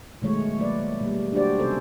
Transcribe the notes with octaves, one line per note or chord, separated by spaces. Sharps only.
B2 D#3 F#3 G#3 A3 C#5
F#3 A#3 B4 D5
B2 G3 A#3
D4 F#4 G4 C5 D5
C3 B3 C#4 D#4 A4 C5